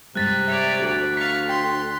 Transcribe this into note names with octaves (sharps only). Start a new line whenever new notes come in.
G2 C3 G3 G#3 F#6 A6 B6
C#5 D5 E5
D2
F5 A#5 C#6 B6
G5 C6